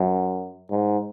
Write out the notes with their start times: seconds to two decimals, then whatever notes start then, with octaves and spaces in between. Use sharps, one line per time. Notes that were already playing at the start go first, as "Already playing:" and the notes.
Already playing: F#2
0.70 G#2